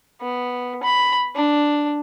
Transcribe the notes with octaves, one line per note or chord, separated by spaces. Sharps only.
B3
B5
D4